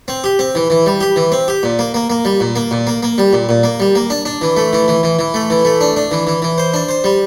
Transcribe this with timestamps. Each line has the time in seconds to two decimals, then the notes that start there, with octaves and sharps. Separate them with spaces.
0.08 C4
0.24 G4
0.39 C4
0.55 E3
0.70 E3
0.86 G3
1.01 G4
1.16 E3
1.32 C4
1.48 G4
1.63 A#2
1.79 A#3
1.94 A#3
2.10 A#3
2.25 G3
2.40 A#2
2.56 A#3
2.71 A#2
2.87 A#3
3.03 A#3
3.18 G3
3.33 A#2
3.49 A#2
3.64 A#3
3.80 G3
3.95 A#3
4.10 D4
4.25 D4
4.41 E3
4.57 A3
4.73 E3
4.88 E3
5.03 E3
5.19 E3
5.34 A3
5.50 E3
5.65 A3
5.81 D4
5.96 D4
6.11 E3
6.27 E3
6.42 E3
6.58 C5
6.74 D4
6.89 C5
7.04 G3